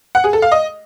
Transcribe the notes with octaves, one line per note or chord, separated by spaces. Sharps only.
F#5
G#4
A4
F5
D#5